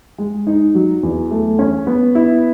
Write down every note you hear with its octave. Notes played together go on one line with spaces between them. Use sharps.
G#3
D#4
F#3
E2
A3
C#4
B3
E4